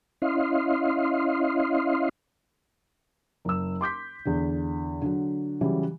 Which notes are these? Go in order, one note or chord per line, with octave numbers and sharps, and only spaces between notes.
C#4 E4 D#5 F5 C6
F#1 E6
C6 D6 G6 B6
E2 D3
D3 F#3
C#3 E3 F#3 G3